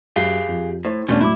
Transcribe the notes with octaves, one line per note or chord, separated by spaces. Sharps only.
F#2 G4 G#4 F5
F2
A2 C5
E1 A3 B3 C#4 D4
A2 F#3 E4 D6